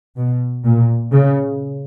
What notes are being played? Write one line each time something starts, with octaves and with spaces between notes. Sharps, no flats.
B2
A#2
C#3